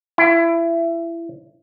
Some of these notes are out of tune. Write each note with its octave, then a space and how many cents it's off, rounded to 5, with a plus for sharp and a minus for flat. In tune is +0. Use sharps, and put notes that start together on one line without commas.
E4 +25